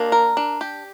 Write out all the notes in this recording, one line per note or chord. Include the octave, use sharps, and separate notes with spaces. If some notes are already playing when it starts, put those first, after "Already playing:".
Already playing: A#3 D4
A#4
D4
G4